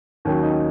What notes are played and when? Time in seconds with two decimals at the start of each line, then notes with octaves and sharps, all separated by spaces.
0.25 D#2 D#3 F#3 C#4
0.43 D#4